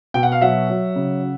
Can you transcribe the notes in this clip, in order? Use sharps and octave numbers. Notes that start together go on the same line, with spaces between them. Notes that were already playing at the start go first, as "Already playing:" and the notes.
B2 G5
F#5
F5
F#3 E5 F#5
F#3
C#3